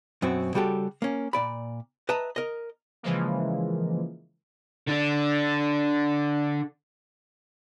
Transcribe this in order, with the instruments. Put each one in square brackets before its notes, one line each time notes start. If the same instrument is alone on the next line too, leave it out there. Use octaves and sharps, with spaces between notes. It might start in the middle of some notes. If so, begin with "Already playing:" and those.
[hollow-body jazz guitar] F#2 B2 C4 F#4
C#3 G3 F#4 G4 A4
A#3 C#4
A#2 D5 B5
B4 D#5 E5 A5 A#5
A#4 D#5
[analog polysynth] C#3 E3 F3 G#3 A#3
[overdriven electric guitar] D3 D4